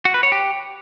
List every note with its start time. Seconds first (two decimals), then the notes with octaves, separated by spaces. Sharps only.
0.05 F#4
0.14 B4
0.23 C#5
0.32 G4